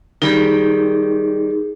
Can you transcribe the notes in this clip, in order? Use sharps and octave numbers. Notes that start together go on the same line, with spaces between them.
D#3 G3 D#4 G#4